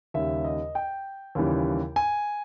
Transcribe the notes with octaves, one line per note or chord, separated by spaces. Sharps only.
D#2 C#3 G3 E5
D#5
G5
D#2 C#3 E3 G3
G#5